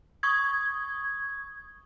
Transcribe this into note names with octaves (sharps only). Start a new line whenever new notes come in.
C#6 D#6 G#6